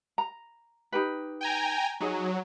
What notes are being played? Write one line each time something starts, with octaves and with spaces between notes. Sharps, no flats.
A#5
D#4 G4 B4
G5 G#5 A#5
F#3 D#4 G#4